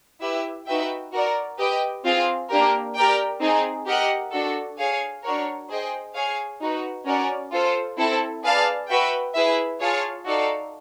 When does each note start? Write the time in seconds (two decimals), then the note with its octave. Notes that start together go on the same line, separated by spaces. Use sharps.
0.21 E4 G4 B4 E5
0.66 D#4 F#4 B4 E5 G5
1.12 F#4 A#4 D5
1.58 G4 B4 D#5 G5
2.04 C4 F4 G#4
2.49 A#3 D4 G4 A#4
2.95 G4 A#4 D5 G5
3.41 C4 D#4 G#4
3.87 G4 A#4 D#5 F#5
4.32 D4 F#4 A4
4.78 G#4 C#5 F5 G#5
5.23 D4 F#4 A#4 C#5
5.69 G#4 C5 D#5 G5
6.15 G#4 C#5 F5 G#5
6.60 D#4 F#4 B4
7.05 C#4 F#4 A#4 D5
7.51 F4 A4 C5
7.97 C4 E4 A4
8.43 G#4 B4 D5 F5 A5
8.88 F#4 B4 E5 G5
9.34 E4 G#4 B4 E5
9.80 F4 G#4 C#5 F5 A5
10.26 D#4 F#4 A4 D5 F5